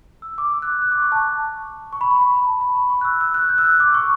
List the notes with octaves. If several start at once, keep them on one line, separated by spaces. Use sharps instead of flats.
E6
D6
E6
F#6
G6
F#6
D6
C#6
A5
C#6
B5
C#6
B5
A5
B5
B5
C#6
F#6
E6
E6
F#6
G6
E6
F#6
D6
C#6